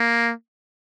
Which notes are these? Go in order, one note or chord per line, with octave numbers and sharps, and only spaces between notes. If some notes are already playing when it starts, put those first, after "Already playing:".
Already playing: A#3